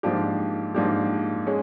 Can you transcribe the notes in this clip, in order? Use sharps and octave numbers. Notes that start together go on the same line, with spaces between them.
G#2 F3 A#3 D4 G4
G#2 F3 A#3 D4 G4
G#3 C#4